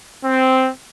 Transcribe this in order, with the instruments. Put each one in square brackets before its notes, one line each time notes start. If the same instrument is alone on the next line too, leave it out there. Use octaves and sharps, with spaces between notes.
[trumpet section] C4